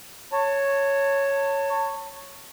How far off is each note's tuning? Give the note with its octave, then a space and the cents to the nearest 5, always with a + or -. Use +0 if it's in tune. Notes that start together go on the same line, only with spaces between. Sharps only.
C#5 +0 A5 +30